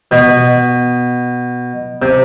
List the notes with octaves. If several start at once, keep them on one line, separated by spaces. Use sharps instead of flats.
B2
C3